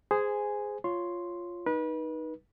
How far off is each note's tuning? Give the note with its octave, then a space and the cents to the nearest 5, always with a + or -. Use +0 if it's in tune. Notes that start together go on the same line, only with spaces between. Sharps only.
G#4 -5 C5 -20 G#5 +0
F4 +0 C#5 +0 C6 +0
D#4 +0 B4 -30